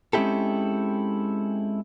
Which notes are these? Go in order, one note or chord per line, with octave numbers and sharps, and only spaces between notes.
G#3 C4 C#4 E4 G4 A4